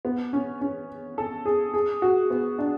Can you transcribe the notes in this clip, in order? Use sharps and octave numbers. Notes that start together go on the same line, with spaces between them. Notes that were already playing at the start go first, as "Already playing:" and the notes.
B3
C#4
C#4
A4
G#4
G#4
F#4
B3
D4